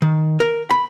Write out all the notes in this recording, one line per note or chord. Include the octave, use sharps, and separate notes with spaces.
D#3
A#4
B5